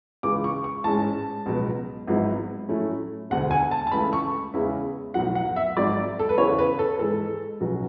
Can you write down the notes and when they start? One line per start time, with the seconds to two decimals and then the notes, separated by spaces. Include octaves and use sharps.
0.23 C#2 C#3 E3 D6
0.44 C#6
0.64 C#6
0.84 A1 G#2 G#3 C#4 A5
1.46 C#2 B2 F#3 B3
2.07 G#1 G#2 F#3 B3 E4
2.69 A2 F#3 A3 C#4 E4
3.30 E1 D2 D3 F#5
3.51 G#5
3.71 A5
3.87 A5
3.91 C#2 C#3 E3 A3 B5
4.13 C#6
4.54 E2 C#3 G#3 C#4 E4
5.14 B1 A2 F#3 F#5
5.35 F#5
5.56 E5
5.76 G#1 G#2 F#3 D5
6.19 A4
6.29 B4
6.38 E2 C#3 E3 C#5
6.59 B4
6.79 A4
6.99 G#2 E3 G#3 A4
7.61 B1 B2 F#3 C#4